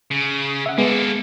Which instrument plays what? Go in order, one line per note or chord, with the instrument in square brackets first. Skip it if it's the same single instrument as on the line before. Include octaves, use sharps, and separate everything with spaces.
[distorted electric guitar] C#3
[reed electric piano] E5 F#5
[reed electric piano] G#3 B3 G#4 [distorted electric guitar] A#3 A4